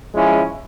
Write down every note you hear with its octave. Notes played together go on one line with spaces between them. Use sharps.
F3 G#3 C#4 E4